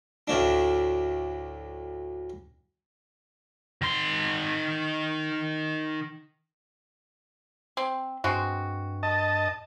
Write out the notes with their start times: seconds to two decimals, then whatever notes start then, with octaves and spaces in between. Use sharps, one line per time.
0.28 D2 A2 D4
3.82 D#3 C6
7.77 C4
8.24 G2 G#3 C4 F#4
9.03 D#5 A5